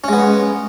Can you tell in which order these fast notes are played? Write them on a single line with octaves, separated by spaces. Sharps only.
C#4 G#3 B3